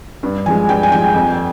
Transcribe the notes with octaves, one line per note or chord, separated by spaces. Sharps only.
G2
F3 G#3 G#5
G2 G5
G#5
F3 G#3 G5
F2